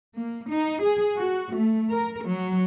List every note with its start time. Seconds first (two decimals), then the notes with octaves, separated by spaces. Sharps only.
0.17 A#3
0.51 D#4
0.81 G#4
1.16 F#4
1.53 A3
1.92 A#4
2.25 F#3